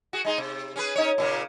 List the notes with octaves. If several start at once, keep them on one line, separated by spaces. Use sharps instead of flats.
F#4 G#4
G#3 D#4 G#4
C3
C#4 G#4 B4
C#4 D#4 C#5
A#2 C#3 A#3